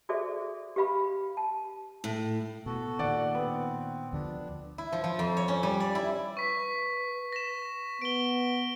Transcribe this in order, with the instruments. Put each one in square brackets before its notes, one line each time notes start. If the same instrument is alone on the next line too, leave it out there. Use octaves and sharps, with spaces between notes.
[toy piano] F#4 G#4 A4 C5 D5 E5
G4 B4 F5 B5
A5
[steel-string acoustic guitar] A2
[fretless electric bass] B2 [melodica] F#4 A4
[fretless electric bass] A#2 D#3 [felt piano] D5 F#5
[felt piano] B3 [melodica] C4
[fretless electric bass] D2 D3 F3 [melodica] D4
[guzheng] E4
F3
F3
F2
C#5
C#4
G3
D5
E4
[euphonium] B4 [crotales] C#6 B6
[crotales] A#6 E7
[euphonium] B3 [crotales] D7 G7